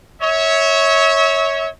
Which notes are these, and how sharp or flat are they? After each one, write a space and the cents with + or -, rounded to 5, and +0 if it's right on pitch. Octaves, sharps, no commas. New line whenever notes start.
C#5 +0 E5 -30